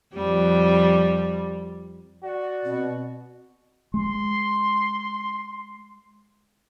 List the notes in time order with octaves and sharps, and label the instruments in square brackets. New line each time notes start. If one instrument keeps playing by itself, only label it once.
[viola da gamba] F2 G3
[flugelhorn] F#4 [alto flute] D5
[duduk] B2 [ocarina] C4
[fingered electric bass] G#3 [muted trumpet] C6